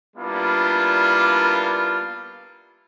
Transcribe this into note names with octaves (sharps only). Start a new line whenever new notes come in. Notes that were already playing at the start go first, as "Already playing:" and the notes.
G3 A#3 B3 D4 E4 F4